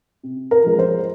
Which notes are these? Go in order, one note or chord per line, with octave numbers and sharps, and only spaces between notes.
C3
A#4
F3 G#3
C5